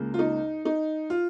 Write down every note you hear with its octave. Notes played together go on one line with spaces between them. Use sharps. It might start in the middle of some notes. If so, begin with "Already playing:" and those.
Already playing: C#2 C#3 A#3
F4
D#4
D#4
F4